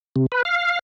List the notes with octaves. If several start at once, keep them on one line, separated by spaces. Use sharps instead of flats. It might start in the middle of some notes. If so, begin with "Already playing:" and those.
C3
B4
F5